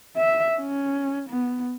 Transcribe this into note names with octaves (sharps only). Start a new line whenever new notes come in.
E5
C#4
B3